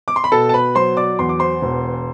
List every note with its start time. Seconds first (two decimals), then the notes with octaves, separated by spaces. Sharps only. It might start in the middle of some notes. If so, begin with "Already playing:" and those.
0.08 D6
0.16 C6
0.24 B5
0.32 B2 A4 A5
0.49 A5
0.54 B4 B5
0.75 F#3 C5 C6
0.97 D5 D6
1.19 E2 C6
1.29 D6
1.39 C5 C6
1.62 E1